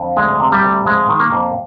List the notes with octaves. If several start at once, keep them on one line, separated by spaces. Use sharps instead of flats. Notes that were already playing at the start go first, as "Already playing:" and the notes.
Already playing: F2 D3
D2 G#3
C3
G3
D2
F2 G#3
D#3
A#3
F2